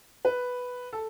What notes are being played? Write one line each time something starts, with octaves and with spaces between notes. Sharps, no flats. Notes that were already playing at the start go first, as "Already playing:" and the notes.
B4
A4